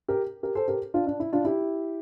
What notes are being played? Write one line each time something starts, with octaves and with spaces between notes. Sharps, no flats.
G4 A#4
G4 A#4
A4 C5
G4 A#4
D4 F4
D4
E4
D4 F4
E4 G4